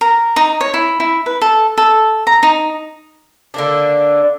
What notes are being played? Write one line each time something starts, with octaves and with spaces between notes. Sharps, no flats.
A#4
D#4
C#5
E4
E4
B4
A4
A4
A#5
D#4
D3 A#3 D4